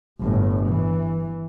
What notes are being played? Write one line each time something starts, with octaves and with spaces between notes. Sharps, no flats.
G1 A2
E3